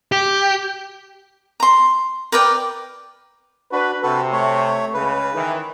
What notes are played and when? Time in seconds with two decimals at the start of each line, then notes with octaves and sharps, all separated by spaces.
0.12 G4
1.60 A#5 C6
2.32 A#4 B4 D5 G5
3.72 D4 F#4 B4
4.03 C3 F#4 A4 B4
4.32 A3 C#5
4.94 C#2 C#3 B4
5.33 D#3 E3